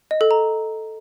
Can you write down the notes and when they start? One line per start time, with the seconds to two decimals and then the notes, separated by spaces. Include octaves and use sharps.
0.11 D#5
0.21 A4
0.31 A#5